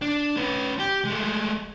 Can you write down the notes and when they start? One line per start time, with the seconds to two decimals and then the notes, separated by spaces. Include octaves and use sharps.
0.02 D4
0.37 C#4 B4
0.79 G4
1.05 G#3 A3